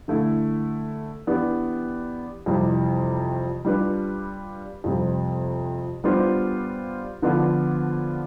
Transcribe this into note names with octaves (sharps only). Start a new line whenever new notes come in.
D3 A3 E4
E3 B3 D4 G4 D5
F2 C3 E3 G3
G3 D4 F4 B4
F2 C3 G3 C4
G3 B3 D4 F4 C5
D3 F3 B3 D4 F4